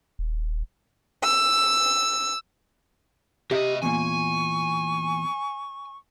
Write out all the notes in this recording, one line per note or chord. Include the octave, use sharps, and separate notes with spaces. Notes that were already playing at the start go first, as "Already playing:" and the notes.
D#1
E6
C3 G4 D#5 E5
E2 A#2 G#5 C#6